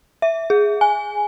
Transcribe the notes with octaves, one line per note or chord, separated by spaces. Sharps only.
E5
G#4
G#5